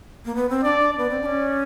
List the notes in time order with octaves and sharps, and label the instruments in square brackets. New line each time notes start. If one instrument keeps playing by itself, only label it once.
[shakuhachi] A#3
B3
C4
[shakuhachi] D4 [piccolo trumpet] D5
[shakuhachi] D4
[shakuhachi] B3 [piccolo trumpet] D5
[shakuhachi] C4
D4
C#4